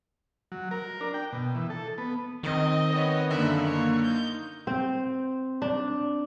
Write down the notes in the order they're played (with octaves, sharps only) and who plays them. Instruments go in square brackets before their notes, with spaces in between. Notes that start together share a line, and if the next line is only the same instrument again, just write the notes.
[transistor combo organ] F#3
A#4
D4
G5
B2
E3
A4
B3
[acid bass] D#3 [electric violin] C4 D#5
[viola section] B3 B4 C#5
[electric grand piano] F#2 D3 [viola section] A#3 [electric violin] E5 B5
[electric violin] C#5
D#4 G6
[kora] C4
D4